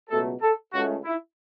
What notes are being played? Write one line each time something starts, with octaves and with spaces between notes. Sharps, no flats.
C#2 B2 F#3 A3 A4
A4
C#2 C#3 A3 F#4
E4